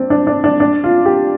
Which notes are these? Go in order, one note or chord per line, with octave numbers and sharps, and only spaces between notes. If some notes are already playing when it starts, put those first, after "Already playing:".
Already playing: C4 D4
D4
D4
D4
D4
F4
G4